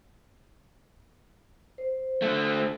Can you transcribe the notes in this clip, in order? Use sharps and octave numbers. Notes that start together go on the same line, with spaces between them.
C5
D3 A3